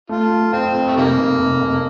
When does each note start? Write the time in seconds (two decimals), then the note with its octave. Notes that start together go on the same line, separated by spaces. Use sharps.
0.09 A3 F4
0.32 A3
0.53 F2 C4
0.74 F2
0.87 A3
0.97 F1 D#3 G3 A#3
1.18 F1
1.39 F1
1.62 F1